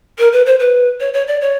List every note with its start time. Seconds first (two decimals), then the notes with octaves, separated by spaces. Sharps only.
0.19 A#4
0.33 B4
0.46 C5
0.60 B4
1.00 C#5
1.14 C#5
1.28 D5
1.41 C#5